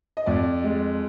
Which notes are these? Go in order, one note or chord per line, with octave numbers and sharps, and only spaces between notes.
D#5
F2 D5
G#3